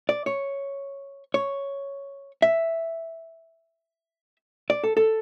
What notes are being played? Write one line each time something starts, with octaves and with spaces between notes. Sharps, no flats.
D5
C#5
C#5
E5
D5
A4
A4